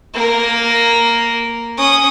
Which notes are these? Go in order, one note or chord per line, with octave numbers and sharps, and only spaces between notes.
A#3 A#4
C#4 D#6